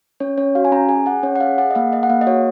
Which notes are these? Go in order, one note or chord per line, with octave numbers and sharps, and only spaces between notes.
C#4 C#5
C#4 C#5
F#4 F5
G#5
C#4 A#5
G#4 G#5
G#4 F#5
C#4 C#5
F#5
G#4 F5
G#4 F#5
D#5
A#3 F5
G#4 D#5
F#5
A#3 F5
D#5
F#4 C#5